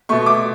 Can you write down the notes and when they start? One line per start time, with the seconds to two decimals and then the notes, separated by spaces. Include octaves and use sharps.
0.09 B2 A3 C#6
0.26 D6